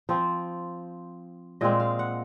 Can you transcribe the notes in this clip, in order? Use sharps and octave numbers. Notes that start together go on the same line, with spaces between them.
F3 C4 C5
A#2 G#3 C4 D#5
F5
F#5